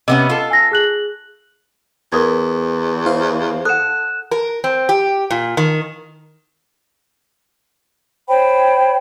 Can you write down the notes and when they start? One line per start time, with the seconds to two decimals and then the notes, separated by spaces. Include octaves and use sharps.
0.08 C3 B3 C#4 D#5
0.30 F4 A4
0.51 G#5 E6 A#6
0.72 G#4 F#6 F#7
2.12 E2 A#4 D#6 G#6
3.06 E4 C5 F5
3.65 A4 F#5 D#6 F#6 E7
4.31 A#4
4.64 C4
4.89 G4
5.31 A#2
5.57 D#3
8.28 C5 C#5 G5 B5